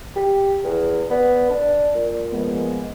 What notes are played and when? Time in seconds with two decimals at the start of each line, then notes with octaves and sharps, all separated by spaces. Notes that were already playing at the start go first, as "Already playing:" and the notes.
0.16 G4
0.64 E2
1.10 B3 D5
1.50 D4
1.95 A#2
2.31 F3 G#3 B3